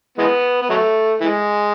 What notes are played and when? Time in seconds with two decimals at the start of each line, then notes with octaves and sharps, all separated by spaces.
0.18 E3 G#3 B3
0.62 B3
0.70 F#3 A3
1.21 E3 G#3